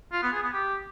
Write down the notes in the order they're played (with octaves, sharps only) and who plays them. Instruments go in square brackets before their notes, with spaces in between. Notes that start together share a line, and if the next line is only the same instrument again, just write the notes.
[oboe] F4
B3
G#4
B3
G4